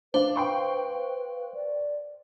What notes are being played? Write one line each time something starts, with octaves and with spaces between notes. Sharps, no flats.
D4 B4 C5 F5
B4 G5 C6 C#6
D5